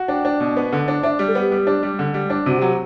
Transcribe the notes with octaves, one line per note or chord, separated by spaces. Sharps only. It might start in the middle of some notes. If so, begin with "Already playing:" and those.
Already playing: F#4
D4 G5
D4
B2
B3
D3
D4
D4 E5
G3
A4
B3 G4
G3
D4
G3
D3
G3
D4
C3 F#4
F#3 G4